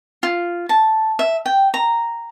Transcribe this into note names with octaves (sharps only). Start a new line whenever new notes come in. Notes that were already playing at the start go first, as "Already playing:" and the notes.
F4
A5
E5
G5
A#5